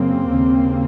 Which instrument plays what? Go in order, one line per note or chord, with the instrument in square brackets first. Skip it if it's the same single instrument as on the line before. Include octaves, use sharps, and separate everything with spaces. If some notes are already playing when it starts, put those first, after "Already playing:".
Already playing: [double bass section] F#2 C#3 A#3 C4
D#2 C#3